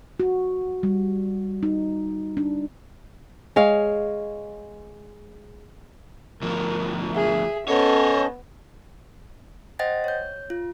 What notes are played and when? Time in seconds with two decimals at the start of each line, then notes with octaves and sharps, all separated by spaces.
0.20 F#4
0.83 G3
1.63 D#4
2.37 D4
3.56 G#3 C#5 F5
6.42 D2 F3 A#4
7.12 G#4 E5
7.68 B3 C#4 A4 C5 C#5 D#5
9.79 C5 D#5 F#5 G5 A6 A#6
10.04 C#5 G6
10.50 F4